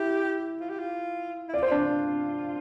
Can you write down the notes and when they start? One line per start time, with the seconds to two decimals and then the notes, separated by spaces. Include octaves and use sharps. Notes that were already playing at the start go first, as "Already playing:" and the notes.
Already playing: E4 G4
0.60 F4
0.70 G4
0.80 F4
1.49 E4
1.54 F4 D5
1.63 C5
1.71 D4 D5